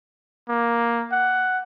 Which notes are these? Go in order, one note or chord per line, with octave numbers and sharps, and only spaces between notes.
A#3
F#5